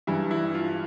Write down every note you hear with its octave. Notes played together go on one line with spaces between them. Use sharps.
G2 E3 G3 E4
E4
F4